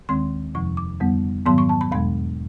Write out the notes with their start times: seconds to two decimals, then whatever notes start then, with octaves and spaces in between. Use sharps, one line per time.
0.09 D#2 D#3 G#3 C4 C6
0.55 F2 C3 F3 C#6
0.77 D6
1.00 F2 D3 G3 B3
1.46 G#2 D#3 F#3 B3 C6
1.58 C#6
1.69 A5
1.81 B5
1.92 E2 B2 G#3 B5